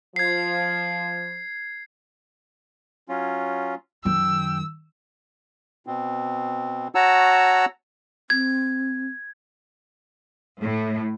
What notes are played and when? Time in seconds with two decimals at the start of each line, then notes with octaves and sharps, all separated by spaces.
0.16 F3 G#6 C7
3.09 F#3 C#4 F4
4.05 F#2 D#3 G5 E6
5.87 B2 C4
6.95 F#4 C#5 F#5 A5 A#5 E6
8.30 C4 G#6
10.62 A2